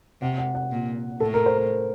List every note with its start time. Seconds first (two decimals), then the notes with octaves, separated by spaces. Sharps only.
0.22 C3 F#5
0.38 F#5
0.55 F#5
0.71 A#2
1.20 A2 A4
1.34 A#4
1.46 C5
1.58 A#4